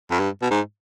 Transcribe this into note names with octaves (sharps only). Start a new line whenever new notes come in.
F2
G2
B2
G#2